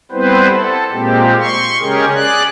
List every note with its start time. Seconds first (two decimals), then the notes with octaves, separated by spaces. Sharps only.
0.12 G3 B3 C4 E4 B4 C5
0.50 A4
0.91 A#2 G#3 A#3 C4 G4
1.38 C6 C#6
1.80 C#3 G#3 C#4 G4 G#4 A#4
2.14 G#4 D5 F#6